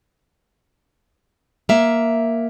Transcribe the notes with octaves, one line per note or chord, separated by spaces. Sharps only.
A#3 E5